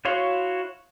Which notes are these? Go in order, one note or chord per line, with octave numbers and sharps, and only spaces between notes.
E4 F#4 C#5 F5 C6